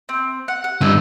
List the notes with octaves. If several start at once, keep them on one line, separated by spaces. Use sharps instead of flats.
C4
F#5
F#5
G2 D3 A#3 D#4 E6